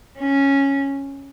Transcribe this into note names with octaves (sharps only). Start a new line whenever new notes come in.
C#4